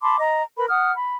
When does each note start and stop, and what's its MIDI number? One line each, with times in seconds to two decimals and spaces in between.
0.02 0.16 81
0.02 0.16 83
0.02 0.16 84
0.02 0.16 86
0.19 0.43 75
0.19 0.43 82
0.56 0.66 70
0.56 0.66 71
0.56 0.66 83
0.70 0.93 78
0.70 0.93 87
0.70 0.93 89
0.96 1.16 83